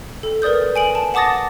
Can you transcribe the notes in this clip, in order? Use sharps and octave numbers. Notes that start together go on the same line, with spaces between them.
A4
A#4 B4 D5 D#6 G6
G#5 D7 F#7
A5
F#5 A5 D6 D#6 A6 A#6